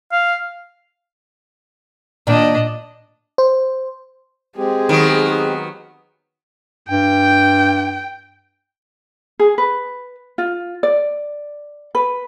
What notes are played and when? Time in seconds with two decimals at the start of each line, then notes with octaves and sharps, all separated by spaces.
0.12 F5
2.27 A#2 D#3 D4 D#5 G5
3.38 C5
4.57 G#3 C4 G4 G#4
4.89 D#3 F#3 B3
6.89 G2 G5
9.39 G#4
9.58 B4
10.38 F4
10.83 D5
11.95 B4